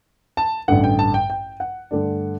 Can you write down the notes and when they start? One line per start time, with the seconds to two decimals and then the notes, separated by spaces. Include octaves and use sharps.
0.37 A5
0.68 A1 G2 D3 F#5
0.84 G5
0.99 A5
1.14 G5
1.30 G5
1.60 F#5
1.91 G2 D3 A3 D4